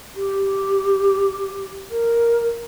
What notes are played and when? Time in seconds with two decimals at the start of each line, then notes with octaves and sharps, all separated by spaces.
0.16 G4
1.90 A#4